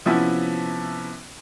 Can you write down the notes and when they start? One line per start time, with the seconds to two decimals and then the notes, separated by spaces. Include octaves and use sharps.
0.06 C3 F3 B3 C#4 E4